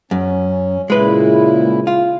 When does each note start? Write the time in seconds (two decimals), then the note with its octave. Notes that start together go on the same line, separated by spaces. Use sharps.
0.11 F#2 C#4
0.90 A#2 C#3 G#3 E4 B4
1.87 F4